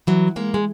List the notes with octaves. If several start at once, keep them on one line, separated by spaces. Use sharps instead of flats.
E3 F#3
G#3 A#3
G#3